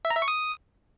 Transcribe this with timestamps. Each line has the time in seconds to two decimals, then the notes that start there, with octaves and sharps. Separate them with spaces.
0.05 E5
0.10 A#5
0.16 E5
0.22 C#6
0.28 D#6